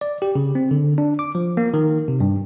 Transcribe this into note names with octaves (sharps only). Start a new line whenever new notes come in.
D5
G4
C#3
C4
D3
D4
D6
F3
A#3
D#3
C3
G2